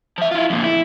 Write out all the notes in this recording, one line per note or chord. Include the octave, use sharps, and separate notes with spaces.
F3 E5
E4 F4
F2 A#2
E4